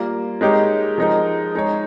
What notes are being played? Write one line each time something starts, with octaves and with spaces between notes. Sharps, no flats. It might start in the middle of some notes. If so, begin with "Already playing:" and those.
Already playing: G3 A#3 F4
G#3 D#4 G4 A#4 C#5
F3 G#3 D#4 A#4
G#3 D#4 G#4 C#5